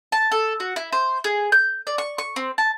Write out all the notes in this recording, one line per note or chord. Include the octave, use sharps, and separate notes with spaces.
A5
A4
F#4
E4
C5
G#4
G6
D5
C#6
C#6
C4
A5